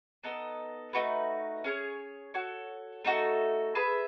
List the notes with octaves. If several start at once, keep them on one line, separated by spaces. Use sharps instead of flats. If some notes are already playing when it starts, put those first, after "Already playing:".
B3 D#4 A4 D#5
A3 D#4 F#4 B4
C#4 G#4 C#5
F#4 A4 C#5
A3 D#4 F#4 A4
G#4 B4 E5 A5